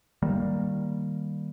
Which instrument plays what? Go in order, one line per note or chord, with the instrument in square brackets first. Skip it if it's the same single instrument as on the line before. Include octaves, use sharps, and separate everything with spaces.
[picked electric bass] D#3 G3 A#3